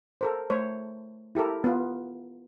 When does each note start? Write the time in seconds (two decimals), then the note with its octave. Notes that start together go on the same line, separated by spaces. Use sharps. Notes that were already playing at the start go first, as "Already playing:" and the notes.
0.21 A4 A#4 C5
0.50 A3 C5 C#5
1.35 E4 G4 A4 A#4
1.64 B3 F4